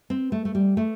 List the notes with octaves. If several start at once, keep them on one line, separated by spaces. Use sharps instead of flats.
C4
A3
A3
G3
A3